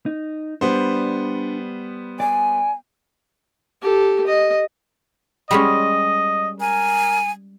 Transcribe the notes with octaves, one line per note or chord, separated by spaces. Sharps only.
D#4
G3 B3 D4 C5
D5 G#5
G4 A4
D#5
G3 G#3 C#4 D#5
A#4 G#5